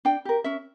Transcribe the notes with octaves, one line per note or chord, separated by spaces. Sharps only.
D4 G5
G4 A#4
C#4 E5